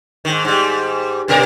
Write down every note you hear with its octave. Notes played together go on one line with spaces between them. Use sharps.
G#2 D#3
G#2 G3
G2 B2 A#4